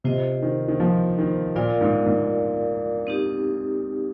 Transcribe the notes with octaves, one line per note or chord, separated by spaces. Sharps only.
C3 F4 C5 D#5
D#3
D#3
F3
D#3
A#2 F4 A#4 D5 F5
G#2
G#2
C4 D#4 G4